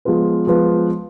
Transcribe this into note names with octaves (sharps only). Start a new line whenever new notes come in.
F3 G#3 B3 F4 B4
F3 G#3 B3 F4 B4